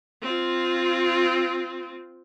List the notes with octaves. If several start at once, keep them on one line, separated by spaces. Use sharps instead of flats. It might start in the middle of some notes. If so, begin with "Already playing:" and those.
C4 F4